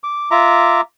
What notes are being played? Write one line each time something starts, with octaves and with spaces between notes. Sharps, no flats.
D6
F4 E5 A#5 D6